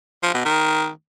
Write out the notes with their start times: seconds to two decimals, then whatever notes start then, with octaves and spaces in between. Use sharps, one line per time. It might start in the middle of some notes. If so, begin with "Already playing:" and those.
0.23 F3
0.34 B2
0.45 D#3